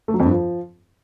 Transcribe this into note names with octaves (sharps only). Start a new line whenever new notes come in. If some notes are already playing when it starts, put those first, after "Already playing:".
A3
F#3
F2
G2
F3